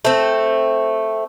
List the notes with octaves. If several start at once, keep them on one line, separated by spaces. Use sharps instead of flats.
A3 C4